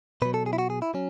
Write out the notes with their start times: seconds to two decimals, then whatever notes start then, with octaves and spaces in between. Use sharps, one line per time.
0.22 B2 B4
0.25 F#3
0.34 A4
0.46 G#4
0.53 E4
0.58 F#4
0.70 G#4
0.82 E4
0.94 F#3 C#4